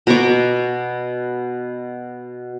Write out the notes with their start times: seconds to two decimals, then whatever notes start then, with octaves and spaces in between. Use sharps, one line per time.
0.07 B2 A#5 C#6 D6